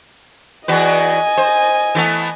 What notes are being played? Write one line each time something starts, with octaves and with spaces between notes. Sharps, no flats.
E2 F#4 B4 D#5 G#5
C5
E3 A3 B3